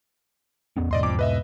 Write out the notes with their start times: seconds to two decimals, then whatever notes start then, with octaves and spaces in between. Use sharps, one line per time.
0.77 E2 B3 C#4
0.91 E2 G#2 B2 D5 D#5 C6
1.03 F2 D6
1.19 B4 D#5 E5